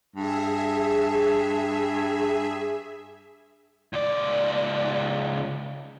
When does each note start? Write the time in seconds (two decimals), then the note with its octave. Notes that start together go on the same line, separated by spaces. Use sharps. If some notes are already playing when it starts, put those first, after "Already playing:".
0.16 G2 G#4 E5
3.93 C#2 D5